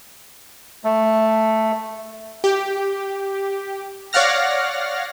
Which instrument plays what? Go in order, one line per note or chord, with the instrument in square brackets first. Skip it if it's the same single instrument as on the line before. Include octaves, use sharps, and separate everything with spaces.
[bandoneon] A3
[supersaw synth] G4
C#5 D5 F5 F#5 F6 A#6